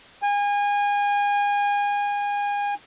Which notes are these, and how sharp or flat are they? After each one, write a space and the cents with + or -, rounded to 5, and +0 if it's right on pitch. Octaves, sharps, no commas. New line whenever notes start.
G#5 -30